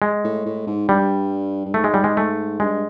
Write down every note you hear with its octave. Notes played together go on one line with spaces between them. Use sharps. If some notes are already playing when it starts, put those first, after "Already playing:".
G#3
A2
A2
G#2
G2 G3
G2
G#2 A3
G#3
G3
G#3
A3
G2 G#3